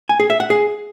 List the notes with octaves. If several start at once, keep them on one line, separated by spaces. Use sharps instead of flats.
G#5
G#4
E5
F#5
G#4